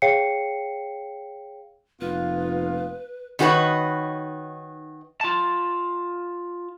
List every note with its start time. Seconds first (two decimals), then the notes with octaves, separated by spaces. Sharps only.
0.02 G#4 C#5 F5 G5 C7 C#7
2.01 F1 A#3 B3 F4 B4
3.39 D#3 D#4 F#4 G4 B4 C#5
5.21 F4 A5